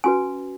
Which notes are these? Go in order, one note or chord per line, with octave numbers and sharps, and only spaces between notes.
C#4 F#4 B4 G#5